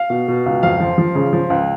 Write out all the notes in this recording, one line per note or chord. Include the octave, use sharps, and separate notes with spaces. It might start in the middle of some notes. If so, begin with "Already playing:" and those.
Already playing: F5
B2
B2
C#2
F2 F5
F3
F3
C#3
F3
C#2